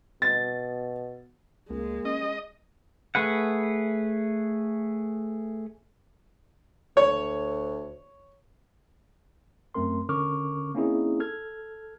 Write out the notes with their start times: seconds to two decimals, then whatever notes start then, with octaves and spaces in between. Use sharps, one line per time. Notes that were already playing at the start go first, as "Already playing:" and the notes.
0.22 B2 A6
1.70 C#2 G#3 A#3
2.05 C#4 D#5
3.15 A3 G#4 B4 F#5
6.97 D2 C#5
9.74 F#2 A3 C4 A#4 C6
10.09 D3 C#4 A#4 C#6 D6 F6
10.75 A#3 C4 C#4 D#4 E4 G#4
11.20 A4 F6 G#6